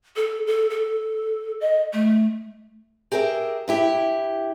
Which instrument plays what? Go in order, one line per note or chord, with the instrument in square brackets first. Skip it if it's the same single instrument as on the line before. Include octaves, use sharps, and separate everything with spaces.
[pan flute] A4
A4
A4
D#5
A3
[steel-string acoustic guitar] G4 G#4 A#4 C#5 E5
G2 E4 G4